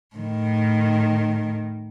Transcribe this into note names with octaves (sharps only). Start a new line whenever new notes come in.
A2 D#3